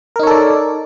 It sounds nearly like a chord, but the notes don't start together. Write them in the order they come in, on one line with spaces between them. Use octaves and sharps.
A#4 D#4 C#5 A4 D5